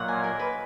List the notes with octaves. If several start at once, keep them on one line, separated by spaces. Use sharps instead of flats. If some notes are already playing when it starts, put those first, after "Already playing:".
Already playing: A#2 F#3 A#3 C#5 D#5 F#5
G#5
A#4
B4